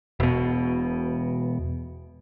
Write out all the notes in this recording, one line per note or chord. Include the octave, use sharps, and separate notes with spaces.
E1 B2